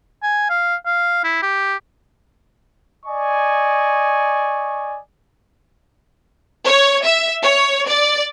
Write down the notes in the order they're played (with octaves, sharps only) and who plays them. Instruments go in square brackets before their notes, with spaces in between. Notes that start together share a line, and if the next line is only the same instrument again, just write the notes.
[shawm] G#5
F5
F5
E4
G4
[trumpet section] D5 D#5 G#5 C#6
[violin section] C#5
E5
C#5
D5